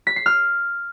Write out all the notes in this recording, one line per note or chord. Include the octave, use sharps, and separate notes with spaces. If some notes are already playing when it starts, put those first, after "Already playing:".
B6
C7
F6